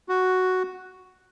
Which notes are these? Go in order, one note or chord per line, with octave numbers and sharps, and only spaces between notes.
F#4